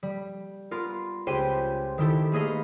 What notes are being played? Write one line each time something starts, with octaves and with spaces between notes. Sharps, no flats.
G3
B3 F4 A#4
C#2 G4 B4 C5 G5 D#7
D#3 E4 G4 A4
A3 A#3 G#4 B4 D#5 F5